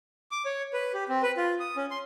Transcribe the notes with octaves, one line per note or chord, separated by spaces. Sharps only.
D6
C#5
B4
G4
C4
B4
F4
D#6
C#4
C6